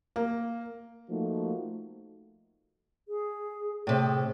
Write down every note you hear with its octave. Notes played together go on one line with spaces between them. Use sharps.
A#3
F3 A3 A#3 D#4 F#4
G#4
A2 C3 G#4